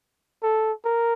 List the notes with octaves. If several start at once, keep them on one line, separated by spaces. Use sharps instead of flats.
A4
A#4